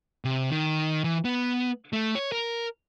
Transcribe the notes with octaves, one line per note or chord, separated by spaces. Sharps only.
C3
D#3
E3
B3
A3
C#5
A#4